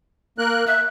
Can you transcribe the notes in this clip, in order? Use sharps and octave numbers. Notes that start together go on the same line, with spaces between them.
A#3 A#4 F#6
E5 F#6